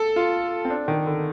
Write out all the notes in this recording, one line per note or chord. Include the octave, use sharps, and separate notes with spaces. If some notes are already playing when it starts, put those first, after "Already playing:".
Already playing: A4
F4
C4
D4
D#3
D3